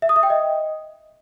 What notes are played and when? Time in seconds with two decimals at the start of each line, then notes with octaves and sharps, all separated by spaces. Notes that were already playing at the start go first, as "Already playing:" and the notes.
0.02 E5
0.09 D#6
0.16 E5
0.23 G5
0.30 D#5